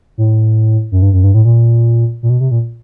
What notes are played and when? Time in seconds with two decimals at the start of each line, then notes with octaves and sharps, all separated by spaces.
0.18 A2
0.92 F#2
1.02 G2
1.13 F#2
1.24 G2
1.34 A2
1.45 A#2
2.23 A#2
2.30 B2
2.40 C3
2.51 A#2